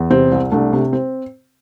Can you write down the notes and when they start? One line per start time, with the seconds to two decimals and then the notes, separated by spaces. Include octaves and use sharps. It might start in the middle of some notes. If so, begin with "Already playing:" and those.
Already playing: E2
0.10 C3 C4
0.32 C2
0.52 C2 A3 D4
0.73 C3
0.93 C4